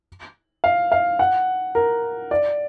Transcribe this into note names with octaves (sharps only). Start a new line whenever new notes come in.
F5
F5
F#5
A#4
D5